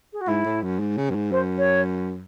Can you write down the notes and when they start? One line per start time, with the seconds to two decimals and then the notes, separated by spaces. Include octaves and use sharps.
0.13 G#4
0.21 F#4
0.28 G#2 E4
0.45 A2
0.63 F#2
0.80 G#2
0.97 C#3
1.10 F#2
1.15 G#2
1.31 F#2 C5
1.58 C#5